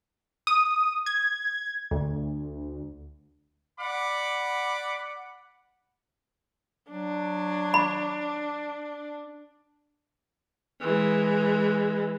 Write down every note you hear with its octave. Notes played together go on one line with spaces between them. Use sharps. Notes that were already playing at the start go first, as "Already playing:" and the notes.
D#6
G#6
D2
D5 F#5 B5 D6
F#3 D4
B5
E3 G#3